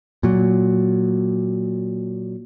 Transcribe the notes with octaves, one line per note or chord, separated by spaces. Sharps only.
A#2 F#3